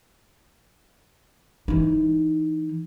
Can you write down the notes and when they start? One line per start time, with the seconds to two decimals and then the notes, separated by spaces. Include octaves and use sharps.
1.68 E3 D#4